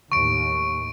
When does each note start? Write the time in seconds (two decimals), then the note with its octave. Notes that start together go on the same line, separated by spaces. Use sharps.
0.12 D#2 A2 C#6 D7